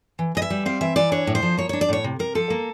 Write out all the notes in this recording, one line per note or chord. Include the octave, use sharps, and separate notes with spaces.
E3
E3 D#5
E5
G3
C4 F5
E3 E5
E3 D5
D4 C#5
A2
C5
F3
A#3 C#5
D4 C#5
D5
A2 C#5
C3
C3 A#4
F3 A4
A#3